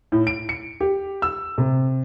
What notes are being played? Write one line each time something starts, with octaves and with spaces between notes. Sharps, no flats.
A2
D7
C#7
G4
E6
C3